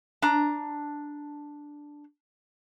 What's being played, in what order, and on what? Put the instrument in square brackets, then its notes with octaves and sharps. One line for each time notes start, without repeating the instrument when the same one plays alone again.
[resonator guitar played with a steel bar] D4 A#5